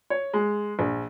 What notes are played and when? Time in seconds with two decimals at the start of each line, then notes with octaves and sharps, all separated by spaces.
0.10 C#5
0.33 G#3
0.79 A#1